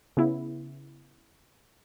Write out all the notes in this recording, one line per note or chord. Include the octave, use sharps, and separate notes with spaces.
C#3 B3 E4